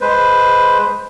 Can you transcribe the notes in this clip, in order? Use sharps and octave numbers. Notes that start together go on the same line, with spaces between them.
G#3 B4 C5